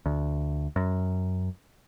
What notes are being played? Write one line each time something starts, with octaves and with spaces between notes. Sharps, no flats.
D2
F#2